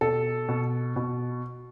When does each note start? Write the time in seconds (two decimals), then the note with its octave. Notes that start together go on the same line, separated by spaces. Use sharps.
0.01 B2 A4
0.49 B2
0.96 B2